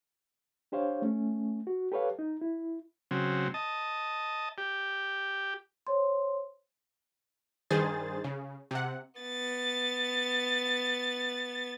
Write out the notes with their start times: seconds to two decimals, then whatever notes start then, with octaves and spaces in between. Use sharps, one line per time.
0.72 D4 G4 C5 C#5 F5
1.02 A3 C#4
1.67 F#4
1.92 G4 A4 B4 C#5 F5
2.19 D#4
2.41 E4
3.11 C#3 F#3 C4
3.54 D#5 A5
4.58 G4
5.87 C5 C#5 C6
7.70 G2 D#3 G#4 C5 A6
8.24 C#3
8.71 C3 F#5
9.20 B3 A6